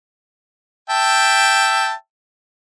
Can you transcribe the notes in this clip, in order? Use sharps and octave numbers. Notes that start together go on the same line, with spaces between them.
E5 G5 A5